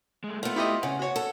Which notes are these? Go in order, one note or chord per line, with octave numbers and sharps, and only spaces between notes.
G#3 A3
A3 B3 F4
E4 G4 D#5
C#3 C#4 F#5
F#4 C#5
A4